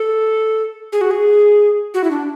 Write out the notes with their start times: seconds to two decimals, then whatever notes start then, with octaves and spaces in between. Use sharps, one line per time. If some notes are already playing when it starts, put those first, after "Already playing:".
Already playing: A4
0.93 G#4
1.01 F#4
1.11 G#4
1.94 F#4
2.04 E4
2.11 D4